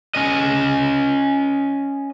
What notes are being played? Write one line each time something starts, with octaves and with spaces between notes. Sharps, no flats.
C#4 D#5